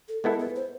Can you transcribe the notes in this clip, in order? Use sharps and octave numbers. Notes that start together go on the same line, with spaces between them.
A4
G#3 B3 E4 A4 A#4
B4
C5